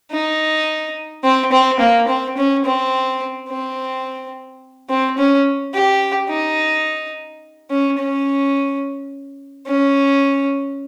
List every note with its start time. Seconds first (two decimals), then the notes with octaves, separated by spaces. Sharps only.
0.11 D#4
1.24 C4
1.52 C4
1.80 A#3
2.08 C4
2.37 C#4
2.65 C4
3.49 C4
4.89 C4
5.18 C#4
5.74 G4
6.30 D#4
7.71 C#4
7.99 C#4
9.67 C#4